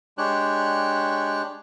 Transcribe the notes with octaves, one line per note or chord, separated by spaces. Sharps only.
G#3 D4 G4 C#5 F#6